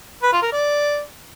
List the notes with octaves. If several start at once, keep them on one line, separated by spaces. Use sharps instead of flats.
B4
F4
A#4
D5